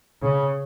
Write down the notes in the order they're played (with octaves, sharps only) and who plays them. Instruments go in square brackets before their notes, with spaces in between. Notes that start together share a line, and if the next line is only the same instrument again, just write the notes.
[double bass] C#3